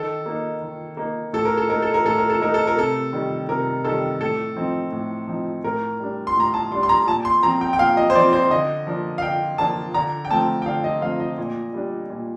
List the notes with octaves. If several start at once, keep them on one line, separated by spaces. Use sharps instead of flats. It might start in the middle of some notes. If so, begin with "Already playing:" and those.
Already playing: D#3 A4
A#3 D#4
D#3
A#3 D#4
A2 A4
A#4
A4
A3 D#4 A#4
A4
A#4
A2 A4
A#4
A4
A3 D#4 A#4
A4
A#4
C3 A4
D#3 G3
C3 A#4
D#3 G3 A4
A2 A4
F3 C4 D#4
A2
F3 C4 D#4
A2 A#4
G3 D4
C6
A2 A#5
A5
G3 D4 C6
C6
A#5
A#2 A5
C6
F3 C4 A#5
G5
G5
A#2 F5
D#5
C5
F3 C4 D5
C5
D3 D#5
F3 A#3 D4
F5
D3 G5
F3 A#3 D4 A5
D3 A#5
G5
F3 A3 C4 A5
G5
D3 F5
D#5
F3 A3 C4 F5
D#5
A#2
G3 D4
A#2